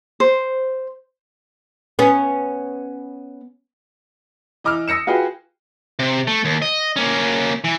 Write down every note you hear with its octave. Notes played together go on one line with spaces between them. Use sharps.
C5
B3 C#4
E3 D#5 D6 E6 F6
D#6 E6 A#6 C#7 E7
F4 F#4 G#4 B4 G5
C3
A3
D#2
D#5
A#3 C#4
E3